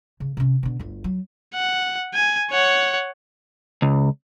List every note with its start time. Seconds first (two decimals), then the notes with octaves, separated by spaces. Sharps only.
0.20 C#3
0.37 C3 C#4
0.63 B2 D3
0.79 G1 D2
1.04 F#3
1.54 F#5
2.14 G#5
2.51 C#5 F#5
3.82 C#2